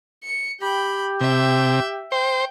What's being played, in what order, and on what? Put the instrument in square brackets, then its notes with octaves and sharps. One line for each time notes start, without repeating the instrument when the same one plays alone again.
[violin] C#7
[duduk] G4 [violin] G5 B5
[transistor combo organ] C3 [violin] E5 G5
[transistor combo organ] C5 [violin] G5